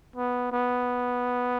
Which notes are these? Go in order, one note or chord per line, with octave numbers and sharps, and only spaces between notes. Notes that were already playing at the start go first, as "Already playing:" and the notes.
B3
B3